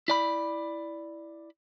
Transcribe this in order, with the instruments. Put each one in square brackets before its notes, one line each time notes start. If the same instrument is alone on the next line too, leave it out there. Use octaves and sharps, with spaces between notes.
[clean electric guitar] E4 D5 B5